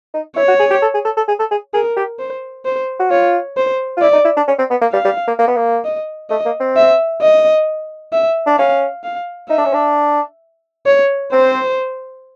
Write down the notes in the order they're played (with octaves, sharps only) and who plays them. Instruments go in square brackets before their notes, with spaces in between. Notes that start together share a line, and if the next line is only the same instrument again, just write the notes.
[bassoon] D#4
[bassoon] E4 [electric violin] C#5
[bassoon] F#4
G#4
G4
A4
G#4
A4
A4
G#4
A4
G#4
[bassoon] G#4 [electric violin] A#4
[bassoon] G4
[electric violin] C5
C5
[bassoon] F#4
[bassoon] F4 [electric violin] C#5
[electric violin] C5
[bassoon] F4
[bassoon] E4 [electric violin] D5
[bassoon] D#4
E4
D4
C#4
C4
B3
A#3
[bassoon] G3 [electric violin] F5
[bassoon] G3
A#3
A#3
B3
A#3
[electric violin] D#5
[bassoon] A3 [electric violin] D#5
[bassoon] A#3
C4
[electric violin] E5
D#5
E5
[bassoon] D4
[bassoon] C#4 [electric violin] F5
[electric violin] F5
[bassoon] D#4 [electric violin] E5
[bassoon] D4
C#4
D4
[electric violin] C#5
[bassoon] C4 [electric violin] C5